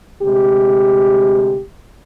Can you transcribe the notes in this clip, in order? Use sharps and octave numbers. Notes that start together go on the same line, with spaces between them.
D2 C3 G#3 G4